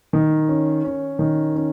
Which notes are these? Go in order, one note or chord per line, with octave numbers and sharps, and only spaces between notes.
D#3
C#4
C#4
D#3
C#4